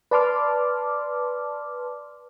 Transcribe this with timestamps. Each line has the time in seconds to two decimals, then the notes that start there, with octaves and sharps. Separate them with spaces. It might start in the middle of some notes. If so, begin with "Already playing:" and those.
0.11 B4 D5 A5 C6 D6 F6